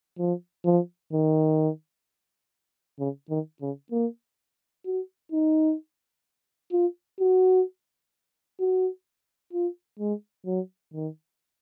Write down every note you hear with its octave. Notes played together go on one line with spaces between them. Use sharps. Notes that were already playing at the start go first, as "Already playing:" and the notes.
F3
F3
D#3
C#3
D#3
C#3
A#3
F#4
D#4
F4
F#4
F#4
F4
G#3
F#3
D#3